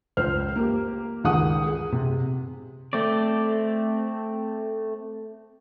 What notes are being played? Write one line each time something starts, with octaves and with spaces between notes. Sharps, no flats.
C#2 C5 F6
A#3 G4
C#2 D#3 G#4 F#5 D#6
G#4
C3
A3 C4 D5